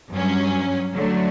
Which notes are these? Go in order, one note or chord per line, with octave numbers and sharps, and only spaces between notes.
G2 F#3 C#4
D3 F#3 A3